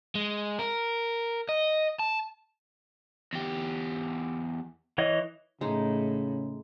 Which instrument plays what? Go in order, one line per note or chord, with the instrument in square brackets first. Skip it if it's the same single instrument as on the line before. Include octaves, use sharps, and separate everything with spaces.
[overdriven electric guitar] G#3
A#4
D#5
A5
E2 G4
[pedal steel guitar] E3 C#5 D#5
[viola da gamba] A2 [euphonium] C#3 [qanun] G#3 D#4